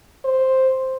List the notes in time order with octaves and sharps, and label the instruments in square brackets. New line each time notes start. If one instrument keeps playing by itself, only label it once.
[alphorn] C5